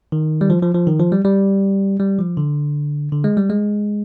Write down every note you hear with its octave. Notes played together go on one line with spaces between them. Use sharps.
D#3
G3
F3
F3
F3
D#3
F3
G3
G3
G3
F3
D3
D3
G#3
G3
G#3